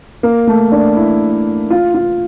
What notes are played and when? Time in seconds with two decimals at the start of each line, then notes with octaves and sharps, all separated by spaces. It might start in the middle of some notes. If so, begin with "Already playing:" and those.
0.23 A#3
0.47 A3
0.72 D4
0.97 E4
1.70 F4
1.94 F4